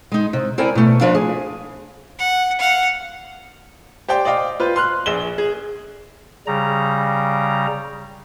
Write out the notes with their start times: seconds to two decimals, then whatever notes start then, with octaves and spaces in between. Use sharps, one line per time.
0.12 G#3 D#4
0.33 C3
0.58 C4 E4 A#4 D5 G#5
0.75 B2 A3
1.01 F3 A#3 D4 B4 E5 F5
1.15 G#4
2.19 F#5
2.58 F5 F#5
4.09 G4 C5 D5 G5
4.25 D5 D#5 F5 G5
4.60 F4 B4 C5
4.76 C6 F6 F#6
5.06 A#1 G#4 E7 G7
5.38 G#4
6.47 C#3 G3 A#5